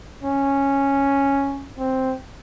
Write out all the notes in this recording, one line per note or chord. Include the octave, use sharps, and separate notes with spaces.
C#4
C4